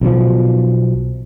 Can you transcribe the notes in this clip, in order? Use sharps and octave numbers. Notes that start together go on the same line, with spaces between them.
B1 B2 D3 F3